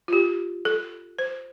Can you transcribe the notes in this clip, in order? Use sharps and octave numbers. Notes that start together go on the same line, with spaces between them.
F4
G4
A4
C5